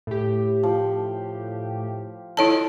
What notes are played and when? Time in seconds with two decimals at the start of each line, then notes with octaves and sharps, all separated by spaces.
0.07 A2 G4
0.63 F3
2.37 E4 F4 A4 C#5 D#5 A5